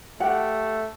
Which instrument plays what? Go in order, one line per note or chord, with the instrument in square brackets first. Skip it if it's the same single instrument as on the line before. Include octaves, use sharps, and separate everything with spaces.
[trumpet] A3 [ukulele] G4 F#5